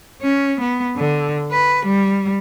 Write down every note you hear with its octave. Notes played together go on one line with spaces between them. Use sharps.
C#4
B3
D3
B4
G3